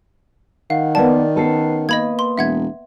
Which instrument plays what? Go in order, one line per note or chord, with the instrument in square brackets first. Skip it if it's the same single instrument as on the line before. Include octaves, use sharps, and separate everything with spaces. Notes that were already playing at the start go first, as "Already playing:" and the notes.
[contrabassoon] D#3 [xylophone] F5 [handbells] F#5
[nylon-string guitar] F2 A#3 B3 [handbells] D5 [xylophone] A5
[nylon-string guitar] B3 C#4 A4 [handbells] B4 C7
[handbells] A#3 [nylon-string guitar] B4 [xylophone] D#5 B5 G#6
[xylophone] C6
[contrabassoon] E1 [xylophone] E5 F#5 G#6